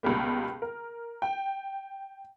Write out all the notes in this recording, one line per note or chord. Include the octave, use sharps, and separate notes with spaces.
C#2 B2 G3 A#3
A#4
G5